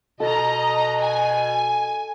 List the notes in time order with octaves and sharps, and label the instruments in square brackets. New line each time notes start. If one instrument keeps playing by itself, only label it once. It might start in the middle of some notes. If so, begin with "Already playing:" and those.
[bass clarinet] B2 [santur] A4 [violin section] D#5 A#5
[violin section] G#5